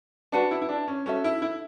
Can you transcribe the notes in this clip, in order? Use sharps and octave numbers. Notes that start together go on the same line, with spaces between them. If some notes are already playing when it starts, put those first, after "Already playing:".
D4 F#4 B4 F#5 A5
E4
E4
D4
C#4
C#4 F#4 A4 E5
E4
E4